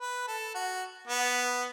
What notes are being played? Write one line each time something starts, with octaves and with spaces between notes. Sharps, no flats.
B4
A4
F#4
B3